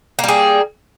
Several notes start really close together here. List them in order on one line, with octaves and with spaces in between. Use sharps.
A#3 G3 G#4